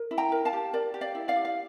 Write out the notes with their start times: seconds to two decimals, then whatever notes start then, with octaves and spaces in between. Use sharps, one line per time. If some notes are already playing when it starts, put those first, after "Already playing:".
Already playing: A#4
0.11 E4
0.18 G5 A#5
0.32 A#4
0.45 F5 A5
0.53 G4
0.73 A#4 D5
0.94 G4
1.01 D5 F5
1.15 E4
1.28 D5 F5
1.36 G4
1.45 F5